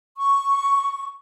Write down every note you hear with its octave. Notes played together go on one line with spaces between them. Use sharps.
C#6